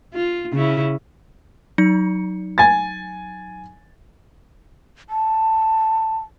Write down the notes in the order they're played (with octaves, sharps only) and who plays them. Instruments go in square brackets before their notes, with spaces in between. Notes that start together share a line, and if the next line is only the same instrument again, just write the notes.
[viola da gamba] F4
C#3 C#4 E4
[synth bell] F#3 D#4 C#7
[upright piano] G#5 A6
[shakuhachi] A5